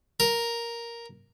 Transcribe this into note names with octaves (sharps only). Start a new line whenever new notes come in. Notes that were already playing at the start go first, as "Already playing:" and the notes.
A#4